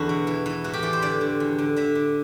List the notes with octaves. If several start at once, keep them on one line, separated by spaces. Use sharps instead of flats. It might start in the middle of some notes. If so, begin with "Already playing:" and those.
Already playing: E2 D3 F#4
B2
E3
E3
A2 F#4
G4
E3 D5
C5
D3 D5
D3
E2
D3
D3 E5
D3